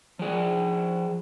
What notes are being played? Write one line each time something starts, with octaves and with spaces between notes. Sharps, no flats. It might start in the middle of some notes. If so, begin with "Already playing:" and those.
F3 G#4